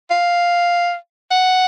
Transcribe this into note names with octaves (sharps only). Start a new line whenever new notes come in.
F5
F#5